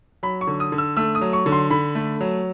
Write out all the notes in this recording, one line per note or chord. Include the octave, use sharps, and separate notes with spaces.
F#3 B5
C#6
D3
D#6
D3
E6
A3 E6
D#6
F#3
C#6
D3
C6
D3 B5
A3
F#3